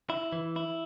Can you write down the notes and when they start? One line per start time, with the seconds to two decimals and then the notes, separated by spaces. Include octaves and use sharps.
0.10 E4
0.32 E3
0.56 E4